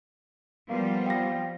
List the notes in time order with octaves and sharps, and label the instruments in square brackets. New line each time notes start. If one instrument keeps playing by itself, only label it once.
[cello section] F3 G3 [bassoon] A#3 [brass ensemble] B3
[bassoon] C4 [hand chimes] F5 A#6